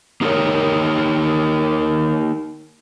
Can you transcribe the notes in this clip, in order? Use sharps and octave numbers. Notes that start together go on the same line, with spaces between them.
A#3 D#4 E4 A4 A#4 C#5